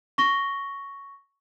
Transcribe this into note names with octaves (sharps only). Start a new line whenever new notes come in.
C#6 A#6 G7